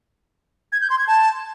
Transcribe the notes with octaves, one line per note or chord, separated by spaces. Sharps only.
G#6
G6
C6
G#6
A5